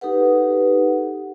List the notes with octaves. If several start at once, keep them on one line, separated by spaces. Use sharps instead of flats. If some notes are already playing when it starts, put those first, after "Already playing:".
D#4 G4 A4 B4 F#5